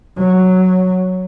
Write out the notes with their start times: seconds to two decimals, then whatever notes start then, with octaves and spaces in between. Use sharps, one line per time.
0.18 F#3